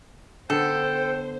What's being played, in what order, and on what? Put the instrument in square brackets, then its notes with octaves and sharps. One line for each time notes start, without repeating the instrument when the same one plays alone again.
[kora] D3 B3 [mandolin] A4 [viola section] C5 [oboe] G5